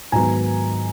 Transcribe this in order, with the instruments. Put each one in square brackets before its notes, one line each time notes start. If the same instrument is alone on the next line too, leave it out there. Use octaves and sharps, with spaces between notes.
[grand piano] G#2 D#3 F#3 B3 G#5 A#5